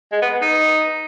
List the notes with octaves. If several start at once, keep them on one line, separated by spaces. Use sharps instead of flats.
G#3
B3
D#4